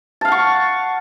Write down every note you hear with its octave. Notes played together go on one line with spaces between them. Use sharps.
F5 F#5 A5 C#6